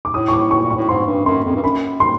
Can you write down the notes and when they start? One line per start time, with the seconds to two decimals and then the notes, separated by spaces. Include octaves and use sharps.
0.05 D6
0.14 A2 D#6
0.28 C#6
0.33 D6
0.51 C#6
0.63 A#2
0.70 C#6
0.76 A2
0.89 G#2 C6
1.07 G2
1.25 F#2 C6
1.45 F2
1.55 G2
1.63 F#2 B5
2.00 C6